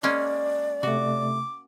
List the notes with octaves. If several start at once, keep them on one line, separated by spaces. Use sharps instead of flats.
G#3 A#3 C#4 D5
C3 A3 F#4 D6